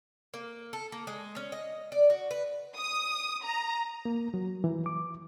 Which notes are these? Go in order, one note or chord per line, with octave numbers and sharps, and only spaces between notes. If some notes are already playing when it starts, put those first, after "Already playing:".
A#3
A4
A#3
G#3
C#4
D#5
D5
F#4
B4
D#6
A#5
A#3
F#3
E3
D6